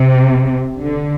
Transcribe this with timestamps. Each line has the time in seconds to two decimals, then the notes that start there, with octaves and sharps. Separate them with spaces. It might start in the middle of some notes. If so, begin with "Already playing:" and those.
Already playing: C3
0.82 D3